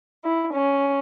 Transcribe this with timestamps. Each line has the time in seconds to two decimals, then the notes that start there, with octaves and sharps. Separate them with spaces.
0.24 E4
0.53 C#4